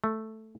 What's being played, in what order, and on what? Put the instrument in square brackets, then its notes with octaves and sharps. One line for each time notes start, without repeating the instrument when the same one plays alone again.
[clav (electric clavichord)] A3